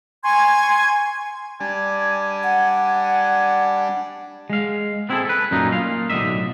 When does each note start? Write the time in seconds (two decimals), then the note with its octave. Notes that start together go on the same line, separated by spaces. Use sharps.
0.24 G#5 C6 C#6 G#6
1.60 G3 D4 G#5
2.43 F#5
4.50 G#3 F5
5.09 B3 C4 E4 F4 G#4 A4
5.25 A4 B4
5.51 F#2 A#2 A3 C#4 D#4
5.72 A#3 F4 F5
6.10 B1 A2 D3 D#5 E5